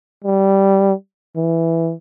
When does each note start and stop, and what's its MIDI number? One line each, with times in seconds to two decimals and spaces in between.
0.24 0.93 55
1.36 1.93 52